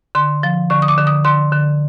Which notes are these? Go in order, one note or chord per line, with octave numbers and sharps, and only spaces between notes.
D3 C6
F3
D3 C#6
D#6
D6
D3
D#6
D3 C6
D3